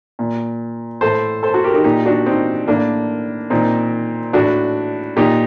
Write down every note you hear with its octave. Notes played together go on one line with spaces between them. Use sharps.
A#2
A2 A4 C5
A4 C5
F#4 A4
G4 A#4
D#4 G4
A#2 D#4 G4
D4 F#4
C4 D#4
A2 A#3 D4
A#2 C4 D#4
A2 D4 F#4
A#2 D#4 G4